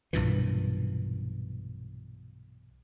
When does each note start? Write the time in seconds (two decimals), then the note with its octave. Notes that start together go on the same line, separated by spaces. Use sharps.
0.13 B1 G2 A#2 E3